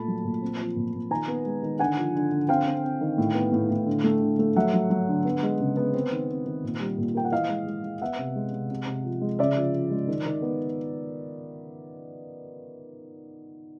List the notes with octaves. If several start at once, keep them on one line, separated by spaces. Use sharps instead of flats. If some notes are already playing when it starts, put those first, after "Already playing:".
Already playing: A#2 A3 A5 B5
F#3
A#2
C4
F3
A#2
A#2
D#3 G#5 A#5
B3
G#3
D#3
D3 F#5 G#5
F3
D3
D3
C4 F5 G5
C4
C4
D#3
A2
B3
A2
A2
D3
A3
D3
A3
F#3 E5 F#5
F#3
F#3
D3
B3
G#3
C#3
B3
C4
D#3
C4
D#3
A#2
G3
A#2
A#3 G5
F#5
E3 D#5 F5
G#3
G#3
G#3
B3 E5 F#5
C3
G#3
C3
C3
C3
F3
G#3
C#3 D5 E5
F3
F3
G#3
D#3
D#3
B3